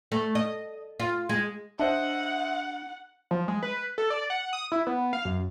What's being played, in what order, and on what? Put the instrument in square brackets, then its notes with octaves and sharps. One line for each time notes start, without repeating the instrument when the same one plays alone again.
[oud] A3
D#5
F4
G#3
[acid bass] D4 [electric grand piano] C5 D#5 E5 [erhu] F#5
[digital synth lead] F3
G#3
B4
A4
D5
F#5
D#6
E4
B3
F5
F#2